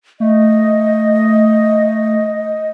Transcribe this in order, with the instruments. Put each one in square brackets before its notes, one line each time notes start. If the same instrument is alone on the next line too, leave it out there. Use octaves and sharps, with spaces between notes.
[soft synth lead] A3 [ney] D#5